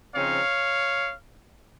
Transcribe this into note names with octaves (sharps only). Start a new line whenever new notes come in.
C#3 F3 C4 D#4 C#5 F5